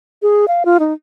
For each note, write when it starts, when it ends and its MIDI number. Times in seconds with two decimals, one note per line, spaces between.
0.22 0.45 68
0.48 0.63 77
0.65 0.77 65
0.80 0.93 63